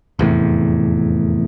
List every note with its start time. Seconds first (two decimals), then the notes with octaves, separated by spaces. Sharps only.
0.19 F1 E2 A2